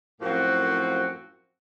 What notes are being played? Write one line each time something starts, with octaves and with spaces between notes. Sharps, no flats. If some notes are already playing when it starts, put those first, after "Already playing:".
F#2 A2 F3 A#3 C4 F#4